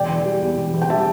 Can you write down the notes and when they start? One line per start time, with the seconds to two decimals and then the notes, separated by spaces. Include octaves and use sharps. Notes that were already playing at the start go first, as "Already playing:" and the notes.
Already playing: E1 D5 G5
0.09 E3
0.25 G3
0.42 E2
0.58 E1
0.74 E3
0.82 G5
0.90 G3 E5 A5